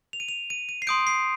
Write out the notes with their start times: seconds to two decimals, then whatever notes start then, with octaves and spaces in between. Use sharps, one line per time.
0.13 F7
0.20 D#7
0.28 F7
0.50 D#7
0.69 D#7
0.82 C7
0.87 C6 D#6 G6 D7
1.07 C7